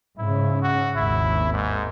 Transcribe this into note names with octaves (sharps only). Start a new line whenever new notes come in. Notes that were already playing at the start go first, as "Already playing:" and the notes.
G#2 C#3 E4
F#4
G#1 D#2 E4
G#2